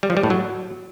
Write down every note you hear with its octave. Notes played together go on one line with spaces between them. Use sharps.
G3
F3
G3
A2
F#3